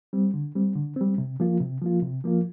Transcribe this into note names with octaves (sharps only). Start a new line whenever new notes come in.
G3 C4
D3
G3 C4
D3
G3 C4
C3
F3 A#3 F4
C3
F3 A#3 F4
C3
F3 A#3 F4